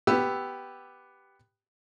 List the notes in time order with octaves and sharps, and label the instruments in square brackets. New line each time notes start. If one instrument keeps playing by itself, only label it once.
[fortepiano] B3 G4 E6